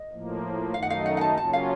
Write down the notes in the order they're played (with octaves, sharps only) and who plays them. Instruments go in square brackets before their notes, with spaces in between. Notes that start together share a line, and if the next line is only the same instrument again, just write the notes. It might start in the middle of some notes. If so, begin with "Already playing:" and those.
Already playing: [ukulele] D#5
[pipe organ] A2 F3 A#3
[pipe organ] F#2 D#3 A3 D#4 [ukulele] F5
[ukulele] F#5
F5
F#5
F#5
A5
[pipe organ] C#3 F#3 A#3 C#4 F4 [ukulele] A5
[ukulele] F5